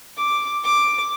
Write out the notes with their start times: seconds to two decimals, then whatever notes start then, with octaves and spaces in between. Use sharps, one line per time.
0.17 D6
0.63 D6